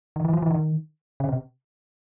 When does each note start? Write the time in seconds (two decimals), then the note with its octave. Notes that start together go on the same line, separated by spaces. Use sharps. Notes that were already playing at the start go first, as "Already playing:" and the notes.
0.16 D#3
0.25 E3
0.33 F3
0.42 E3
0.51 D#3
1.20 C#3
1.29 C3